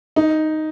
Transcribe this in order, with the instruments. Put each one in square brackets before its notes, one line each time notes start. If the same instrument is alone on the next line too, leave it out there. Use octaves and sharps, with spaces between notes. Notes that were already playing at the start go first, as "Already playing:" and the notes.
[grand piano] D#4